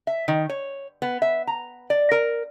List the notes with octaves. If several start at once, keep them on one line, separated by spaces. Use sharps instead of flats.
E5
D#3
C#5
B3
E5
A#5
D5
A#4